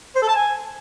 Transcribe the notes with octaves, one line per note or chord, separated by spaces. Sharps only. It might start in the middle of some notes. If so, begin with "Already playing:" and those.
C5
A4
A5
G#5